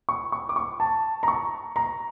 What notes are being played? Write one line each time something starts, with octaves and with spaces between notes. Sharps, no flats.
C#6
C#6
D6
C#6
A5
A#5
C#6
A#5